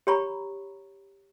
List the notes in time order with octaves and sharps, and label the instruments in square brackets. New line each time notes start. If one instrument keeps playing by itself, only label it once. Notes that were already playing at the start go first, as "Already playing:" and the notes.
[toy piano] G4 C#5 A#5 B5 C#6